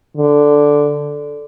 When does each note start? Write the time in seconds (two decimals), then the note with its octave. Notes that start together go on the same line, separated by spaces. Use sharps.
0.17 D3